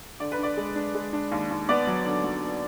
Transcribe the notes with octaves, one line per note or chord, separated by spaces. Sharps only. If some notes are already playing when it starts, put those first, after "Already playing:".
D3 D5
B4
D4 D5
G#3
D4
G#3
D4
D#2
D#2
B3 D5
F#3
D3
F#3
B3